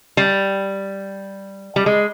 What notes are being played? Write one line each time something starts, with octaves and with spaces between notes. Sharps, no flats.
G3
G3
G#3